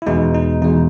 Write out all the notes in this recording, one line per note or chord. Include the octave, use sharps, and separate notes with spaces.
E4
E2 B2 G#3 D#4
D#4
E2 B2 G#3 D#4